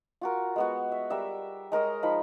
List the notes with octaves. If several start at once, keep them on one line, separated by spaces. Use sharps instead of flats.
F4 F#4 A#4
G#3 B3 F#4
E5
G3 A#4 E5
G#3 A#4 C#5 D#5
F3 D#4 B5